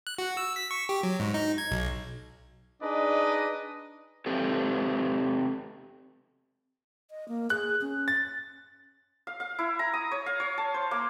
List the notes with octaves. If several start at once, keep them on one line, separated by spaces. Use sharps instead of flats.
F#6
F#4
E6
B6
C#6
G4
F#3
G#2
D#4
G#6
B1
D4 D#4 G#4 B4 D5 D#5
C4 G4 A4 B4
D#5
A#3
G#4 F#6
C#4
A6
F5
F5
E4
A#5
D#6
C#5
F5
C#5
A5
C5
A#3